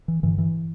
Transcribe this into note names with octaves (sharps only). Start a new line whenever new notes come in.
E3
G2 D3 E3
E3